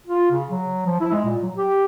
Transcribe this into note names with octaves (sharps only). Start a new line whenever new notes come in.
F4
C#3
F#3
F3
E4
G#3
A#2
F#3
G4